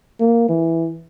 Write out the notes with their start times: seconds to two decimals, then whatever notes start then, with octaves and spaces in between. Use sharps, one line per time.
0.20 A#3
0.49 E3